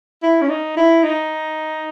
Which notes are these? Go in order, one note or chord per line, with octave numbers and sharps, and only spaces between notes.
E4
C#4
D#4
E4
D#4